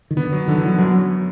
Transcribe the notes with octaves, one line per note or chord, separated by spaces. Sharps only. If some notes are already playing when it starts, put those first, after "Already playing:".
D#3
D3 B3
F#3
D3 D#3
E3
F#3 B3
F#2 F#3
F#2